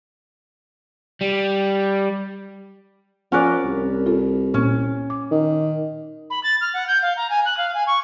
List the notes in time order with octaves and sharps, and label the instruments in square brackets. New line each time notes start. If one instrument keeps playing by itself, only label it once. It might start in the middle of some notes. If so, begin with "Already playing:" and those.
[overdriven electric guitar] G3
[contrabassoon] F3 [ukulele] C#4 A#4 D5 [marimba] F#5 G#5 F#6
[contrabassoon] C2
[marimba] F4 A4
[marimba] A#2 A#3 [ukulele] C#4
[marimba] D6
[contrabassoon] D#3
[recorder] B5
A6
F6
F#5
G6
F5
A#5
G#5
F#6
F5
G#5
C#6